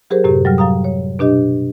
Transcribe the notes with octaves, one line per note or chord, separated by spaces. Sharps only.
F#3 G4 G#4 A#4 C5
F#2 A2 C3 G4
F#3 G3 F6
F#3 F5 A#5 D#6
C#5
B2 D4 G4 D#5